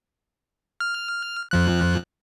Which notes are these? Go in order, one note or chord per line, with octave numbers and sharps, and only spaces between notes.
F6
F2 F3 F#6